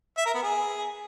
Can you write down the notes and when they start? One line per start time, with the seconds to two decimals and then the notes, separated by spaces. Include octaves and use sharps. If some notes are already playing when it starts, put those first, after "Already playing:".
0.18 E5
0.26 A#4
0.34 B3
0.43 G#4